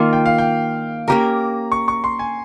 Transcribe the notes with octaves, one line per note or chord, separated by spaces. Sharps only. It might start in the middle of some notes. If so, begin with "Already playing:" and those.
Already playing: D#3 A#3 F4 F5
G5
F5
G5
A#3 C#4 G4 A#4 A#5
C#6
C#6
C6
G#5